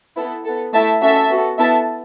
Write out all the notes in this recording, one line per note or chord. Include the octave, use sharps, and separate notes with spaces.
B3 E4 A4
B3 A4
A3 E4 A4 E5 A5
C#4 F#4 A4 E5 A5
B3 F#4 A4
B3 E4 A4 E5 A5